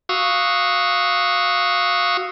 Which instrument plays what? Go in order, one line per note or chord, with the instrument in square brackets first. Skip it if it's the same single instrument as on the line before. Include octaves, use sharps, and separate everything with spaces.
[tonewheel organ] F#4 F5 C#6 D#6 E6